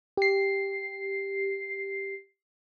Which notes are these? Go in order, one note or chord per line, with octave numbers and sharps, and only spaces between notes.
G4 C7